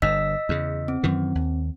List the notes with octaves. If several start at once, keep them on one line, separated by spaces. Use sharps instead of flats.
G1 G2 D#5 E6 B6
E2 C#3
C4
F#2 D#3 E3
D#2